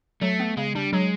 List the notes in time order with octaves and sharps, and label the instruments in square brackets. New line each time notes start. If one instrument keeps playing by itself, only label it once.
[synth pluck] F#3 [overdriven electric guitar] A3
[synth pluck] B3
[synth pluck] C#3 [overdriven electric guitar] G#3
[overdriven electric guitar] G3 [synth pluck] D4
[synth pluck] F#3 [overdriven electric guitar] G#3